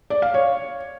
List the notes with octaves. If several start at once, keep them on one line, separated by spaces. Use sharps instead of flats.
D5
F5
C#5